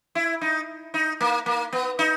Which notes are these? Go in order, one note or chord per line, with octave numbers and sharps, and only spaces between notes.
E4
D#4
D#4
A#3
A#3
B3
D#4